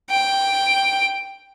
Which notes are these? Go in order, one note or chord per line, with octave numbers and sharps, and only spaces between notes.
G5